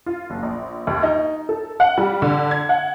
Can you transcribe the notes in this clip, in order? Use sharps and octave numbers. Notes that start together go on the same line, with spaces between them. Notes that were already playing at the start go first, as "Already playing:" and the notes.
F4
F#1
A#1
D#2
D#4
A4
F#5
G3
D3
G#6
F#5